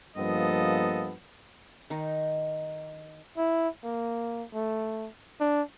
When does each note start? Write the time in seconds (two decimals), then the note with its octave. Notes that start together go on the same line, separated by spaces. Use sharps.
0.17 G2 F3 A#3 B3 A4 D#5
1.90 D#3 D#4
3.38 E4
3.84 A#3
4.54 A3
5.40 D4